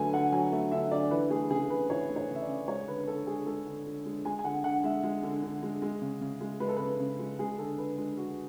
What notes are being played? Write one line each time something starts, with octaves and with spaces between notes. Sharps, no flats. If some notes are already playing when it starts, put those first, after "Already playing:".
Already playing: D3 F#3 A3 B4 G#5
D3 F#5
F#3 G#5
A3
D3 E5
D3 D5
E3 B4
A3 G#4
C#3 G#4
C#3 B4
E3 C#5
A3
C#5
C#3
E5
D5
C#3
G#3 C#5
D3 B4
B4
D3 A4
G#3 G#4
G#3 A4
D3
D3
G#3
G#3 G#5
G#5
D3 F#5
D3 F#5
G#3 E5
G#3
D3
D3
G#3
G#3
C#3
C#3
G#3
G#3 B4
A4
C#3 B4
C#3
G#3
G#3 G#4
D3 A4
D3 B4
G#3
G#3 F#4